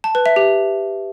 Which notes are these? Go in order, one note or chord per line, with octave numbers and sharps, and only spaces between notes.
A5
B4
E5
G4